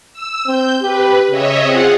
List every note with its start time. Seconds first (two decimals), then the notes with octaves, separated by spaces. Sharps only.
0.13 E6
0.47 C4 G6
0.82 G4 B4
1.31 C#3 C#5 D#5 E5
1.65 C4 F4 G#4 F#5